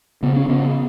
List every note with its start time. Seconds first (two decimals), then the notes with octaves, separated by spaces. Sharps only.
0.23 C#3 B3
0.36 C#4
0.48 C#3 B3